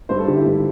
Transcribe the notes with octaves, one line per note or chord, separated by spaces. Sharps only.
G2 C5
A4
D3 G4
E4
G2